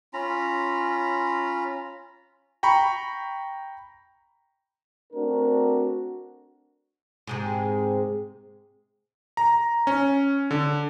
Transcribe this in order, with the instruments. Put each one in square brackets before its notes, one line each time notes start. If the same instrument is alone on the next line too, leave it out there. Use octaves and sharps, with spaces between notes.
[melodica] C#4 F4 A#5 B5
[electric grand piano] G5 A#5 B5 C#6
[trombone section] A3 C4 D4 F#4 A#4
[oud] G#2 C3 G#3
[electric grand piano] A#5
C#4
D3